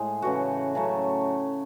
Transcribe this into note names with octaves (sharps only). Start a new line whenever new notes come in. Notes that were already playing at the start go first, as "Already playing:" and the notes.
Already playing: A2 G#3
C#3 E3 A3 F#4
C#3 F#3 A3